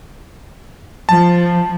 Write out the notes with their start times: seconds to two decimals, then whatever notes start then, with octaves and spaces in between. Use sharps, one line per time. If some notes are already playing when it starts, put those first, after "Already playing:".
1.09 F3 A5